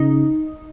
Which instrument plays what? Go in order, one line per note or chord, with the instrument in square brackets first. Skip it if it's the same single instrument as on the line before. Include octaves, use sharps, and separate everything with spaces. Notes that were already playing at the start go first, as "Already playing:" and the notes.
Already playing: [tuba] C#3 [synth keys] D#4